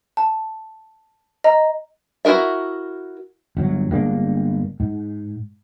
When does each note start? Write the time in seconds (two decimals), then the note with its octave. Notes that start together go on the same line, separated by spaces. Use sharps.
0.17 A5
1.44 D#5 A#5
2.25 E4 F#4 G#4 A#4 E5
3.57 G1 F#3
3.91 G1 G#3 A#3 D4
4.80 G#2